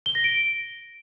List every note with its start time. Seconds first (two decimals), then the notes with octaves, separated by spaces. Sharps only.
0.06 G7
0.15 A#6
0.24 D7